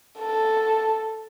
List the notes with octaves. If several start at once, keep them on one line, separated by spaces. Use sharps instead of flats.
A4